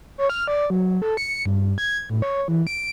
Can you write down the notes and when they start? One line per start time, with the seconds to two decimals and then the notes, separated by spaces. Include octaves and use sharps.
0.18 C#5
0.30 F6
0.48 D5
0.70 F#3
1.02 A4
1.17 C#7
1.46 G2
1.78 G#6
2.10 A2
2.22 C#5
2.48 E3
2.67 D7